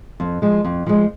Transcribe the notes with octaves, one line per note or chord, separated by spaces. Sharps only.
F2
F3 G#3
F2
F3 G#3